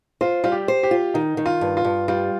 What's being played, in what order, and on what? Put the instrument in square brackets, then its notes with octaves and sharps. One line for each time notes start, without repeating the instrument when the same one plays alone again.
[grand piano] F4 [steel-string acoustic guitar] C5
[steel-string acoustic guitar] G3 [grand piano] F4
[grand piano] G4
[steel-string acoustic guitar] C5
[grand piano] G4
[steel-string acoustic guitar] F4
[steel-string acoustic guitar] D#3 [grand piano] D#4
[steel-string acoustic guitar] D#3
[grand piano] F4
[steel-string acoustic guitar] G2
[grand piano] F4
[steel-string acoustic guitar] G2
[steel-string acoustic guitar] G3 [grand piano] F4